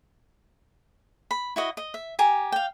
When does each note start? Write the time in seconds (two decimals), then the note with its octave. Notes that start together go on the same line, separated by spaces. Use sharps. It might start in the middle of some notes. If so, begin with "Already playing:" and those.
1.31 B5
1.56 E4 F#4 D#5
1.77 D#5
1.94 E5
2.19 G4 G#5 A#5
2.52 F5 G5